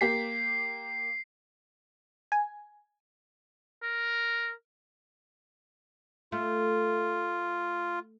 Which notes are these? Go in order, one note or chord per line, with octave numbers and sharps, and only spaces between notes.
A#3 G4 B6 C7
G#5
A#4
A3 F4